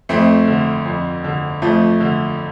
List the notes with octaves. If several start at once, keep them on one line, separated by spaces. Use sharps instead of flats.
F2 A3 C4
D3
F2
D3
F2 F3 A3
D3